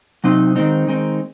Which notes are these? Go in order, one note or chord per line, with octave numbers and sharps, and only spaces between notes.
C3 F#3 C4 D#4
D#3 G#3 C4 D#4
D#3 G#3 C4 D#4